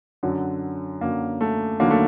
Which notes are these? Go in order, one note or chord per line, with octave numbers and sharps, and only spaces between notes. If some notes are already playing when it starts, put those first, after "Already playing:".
F#2 D3 F#3
F#2 D3 F#3 A#3
A3
D#2 D3 F#3 A#3
A3